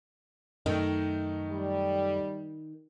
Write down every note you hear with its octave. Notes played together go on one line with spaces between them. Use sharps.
F#2 D#3 A3 D#4
G3